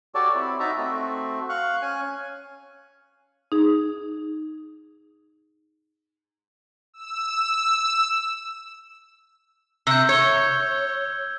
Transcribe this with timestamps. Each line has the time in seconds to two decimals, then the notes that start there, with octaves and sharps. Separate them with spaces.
0.15 F#4 G4 A4 C#5 D5 A5
0.35 C4 E4
0.60 D#4 F#4 E5 A5 A#5
0.77 A3 C4 F#4
1.49 F5 C#6 F#6
1.82 C#4 G#5
3.52 D#4 G#4
6.94 E6
9.87 C3 E6 G6
10.09 C#5 G#6 G7